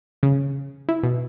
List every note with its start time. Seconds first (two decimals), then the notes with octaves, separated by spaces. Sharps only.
0.23 C#3
0.89 E4
1.03 B2